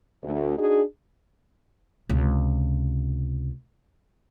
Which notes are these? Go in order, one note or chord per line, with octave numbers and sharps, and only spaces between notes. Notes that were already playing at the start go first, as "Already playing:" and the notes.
D2
D4 D#4 F#4 G#4
C#2 C3